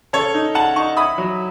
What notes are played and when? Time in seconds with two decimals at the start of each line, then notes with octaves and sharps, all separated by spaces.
0.13 C#3 A4 C#5
0.34 D#4
0.55 C#3 F#5 A5
0.76 D#4 A5 C#6
0.97 E4 B5 D#6
1.18 F#3